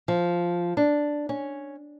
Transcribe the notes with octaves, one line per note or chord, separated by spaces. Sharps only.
F3
D4
C#4